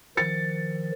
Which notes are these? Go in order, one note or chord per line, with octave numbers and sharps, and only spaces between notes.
D#3 F3 A6 C#7